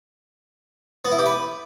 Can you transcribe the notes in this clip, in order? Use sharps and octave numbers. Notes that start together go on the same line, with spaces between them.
B3
E4
G4
B4